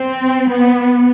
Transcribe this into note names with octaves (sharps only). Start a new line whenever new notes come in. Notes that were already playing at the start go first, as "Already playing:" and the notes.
Already playing: C4
B3